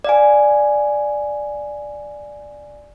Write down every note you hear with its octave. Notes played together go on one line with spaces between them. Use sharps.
D5 F5 G#5